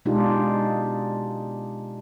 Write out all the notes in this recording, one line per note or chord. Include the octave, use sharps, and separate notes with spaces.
B2 G#3 D4 D#4 F4 G4